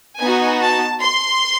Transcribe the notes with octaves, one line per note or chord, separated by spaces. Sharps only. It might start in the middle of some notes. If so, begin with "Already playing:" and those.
B3 D#4 F#4 G#5
A5
C6